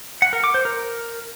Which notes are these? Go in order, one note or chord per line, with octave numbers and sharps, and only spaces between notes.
F#5
A#4
D6
C5
A#4